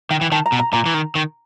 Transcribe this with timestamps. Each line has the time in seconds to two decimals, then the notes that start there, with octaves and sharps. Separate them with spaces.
0.11 D#3 G5
0.21 E3
0.32 D#3 A5
0.46 A#5
0.52 B2
0.59 A#5
0.73 A#2 A#5
0.86 E3
0.94 D#3
1.15 D#3